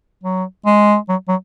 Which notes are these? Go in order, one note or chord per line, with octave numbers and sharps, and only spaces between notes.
F#3
G#3
F#3
F#3